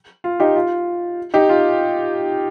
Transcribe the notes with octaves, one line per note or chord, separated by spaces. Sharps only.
F4
D#4 G4
F4
D#4 G4
F4